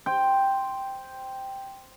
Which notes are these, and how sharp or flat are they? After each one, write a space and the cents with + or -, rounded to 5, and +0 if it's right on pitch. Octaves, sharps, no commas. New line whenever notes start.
C5 +0 G5 +0